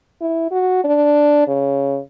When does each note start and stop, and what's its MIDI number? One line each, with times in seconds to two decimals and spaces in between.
0.21 0.49 64
0.51 0.82 66
0.84 1.44 62
1.47 1.98 49